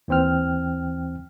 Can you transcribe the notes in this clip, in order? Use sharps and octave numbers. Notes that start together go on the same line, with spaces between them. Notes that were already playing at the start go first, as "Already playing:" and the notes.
D#2 E3 C4 G5 F6